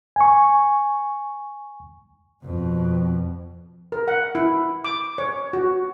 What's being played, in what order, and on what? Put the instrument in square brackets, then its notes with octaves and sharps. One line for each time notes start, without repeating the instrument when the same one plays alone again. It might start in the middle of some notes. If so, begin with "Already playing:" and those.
[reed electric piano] G#5 C#6
[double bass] F2 B2
[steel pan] A#4
F#5
E4
D6
C#5
F#4